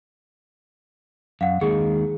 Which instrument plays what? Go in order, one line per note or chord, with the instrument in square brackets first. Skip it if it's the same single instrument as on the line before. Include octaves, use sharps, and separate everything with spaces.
[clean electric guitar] F#2 [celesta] F5 F#5
[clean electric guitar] D#2 D#3 G#3 [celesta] G#4